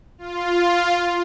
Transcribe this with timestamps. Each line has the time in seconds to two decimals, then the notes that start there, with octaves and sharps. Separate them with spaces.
0.18 F4